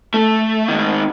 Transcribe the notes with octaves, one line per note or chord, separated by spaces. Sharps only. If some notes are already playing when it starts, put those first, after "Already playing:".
A3
G#2 D#3